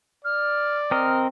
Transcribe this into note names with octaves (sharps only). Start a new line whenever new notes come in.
D5 F6
C4 A#4 D#5 F6